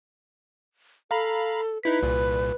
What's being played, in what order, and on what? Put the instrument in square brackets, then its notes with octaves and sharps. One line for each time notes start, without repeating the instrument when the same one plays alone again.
[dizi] A4 [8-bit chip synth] F5 A#5 B5
[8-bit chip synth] D#4 E4 B6 [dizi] B4
[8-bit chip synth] C2 A#2